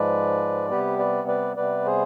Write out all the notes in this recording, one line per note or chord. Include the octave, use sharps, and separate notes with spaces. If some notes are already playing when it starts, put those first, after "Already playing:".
Already playing: G#2 F3 G#3 B4 D5
C3 G3 B3 G4 B4
B4 D5
B4 D5
C3 G3 B3 B4 D5
G#4 C5